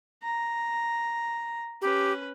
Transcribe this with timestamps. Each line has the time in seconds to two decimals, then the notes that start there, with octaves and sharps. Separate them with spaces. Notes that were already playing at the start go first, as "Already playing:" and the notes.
0.23 A#5
1.82 C#4 G4 B4